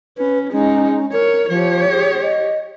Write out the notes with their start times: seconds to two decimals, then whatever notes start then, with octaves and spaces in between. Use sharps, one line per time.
0.18 C#4 B4
0.52 G#3 C#4 D#4
1.13 A#4 C#5
1.49 F3 G4 C#5
1.90 G#4
2.22 D#5